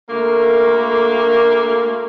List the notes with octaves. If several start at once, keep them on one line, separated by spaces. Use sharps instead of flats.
D2 A3 A#3